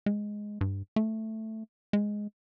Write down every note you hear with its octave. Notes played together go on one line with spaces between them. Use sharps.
G#3
G2
A3
G#3